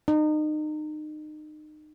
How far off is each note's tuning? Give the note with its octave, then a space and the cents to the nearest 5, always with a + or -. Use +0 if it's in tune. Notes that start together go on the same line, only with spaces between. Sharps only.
D#4 -30